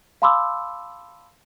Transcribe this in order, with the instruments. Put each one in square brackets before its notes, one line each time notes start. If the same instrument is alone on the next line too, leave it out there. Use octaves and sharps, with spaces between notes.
[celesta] F5 A5 B5 C6 D6 E6